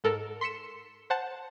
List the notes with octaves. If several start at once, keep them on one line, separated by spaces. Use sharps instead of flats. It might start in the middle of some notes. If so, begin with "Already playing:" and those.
G#2 A4 A#4 A5
C6 B6 C#7 E7
C5 F#5 A5